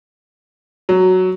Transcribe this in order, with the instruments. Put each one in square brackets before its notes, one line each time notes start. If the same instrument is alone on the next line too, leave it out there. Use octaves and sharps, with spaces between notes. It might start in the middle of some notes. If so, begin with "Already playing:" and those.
[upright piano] F#3